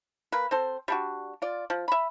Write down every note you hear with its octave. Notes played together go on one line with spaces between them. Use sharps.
A#3 B4
C4 A4 C5
G3 D4 F#4
F4 D5
F3
E5 B5